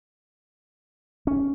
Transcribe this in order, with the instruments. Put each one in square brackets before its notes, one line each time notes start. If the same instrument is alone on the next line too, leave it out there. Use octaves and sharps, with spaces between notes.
[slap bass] C#4